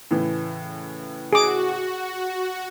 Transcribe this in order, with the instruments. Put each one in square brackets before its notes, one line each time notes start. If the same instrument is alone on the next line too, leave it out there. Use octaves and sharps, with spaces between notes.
[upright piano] A2 C#3 E3
[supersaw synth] F#4 [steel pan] G#4 D6